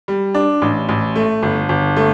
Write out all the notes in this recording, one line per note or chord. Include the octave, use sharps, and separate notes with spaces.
G3
D4
A1
A1
A3
G1
G1
A3